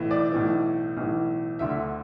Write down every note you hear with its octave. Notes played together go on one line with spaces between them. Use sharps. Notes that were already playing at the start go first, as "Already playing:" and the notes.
Already playing: B1 A2 E3
D5
B1 A2 E3
B1 A2 E3
D2 D3 E5